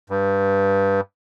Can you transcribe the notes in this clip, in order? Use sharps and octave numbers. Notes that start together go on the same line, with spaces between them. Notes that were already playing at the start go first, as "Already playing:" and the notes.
G2